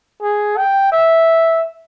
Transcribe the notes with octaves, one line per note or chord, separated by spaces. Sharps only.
G#4
G5
E5